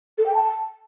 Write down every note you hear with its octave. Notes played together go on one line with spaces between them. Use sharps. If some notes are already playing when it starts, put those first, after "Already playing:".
A4
G5
A5